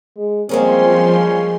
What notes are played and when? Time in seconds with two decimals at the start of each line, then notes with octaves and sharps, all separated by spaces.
0.17 G#3
0.49 F3 G3 G#3 A#3 C4 C#4 G#4 C6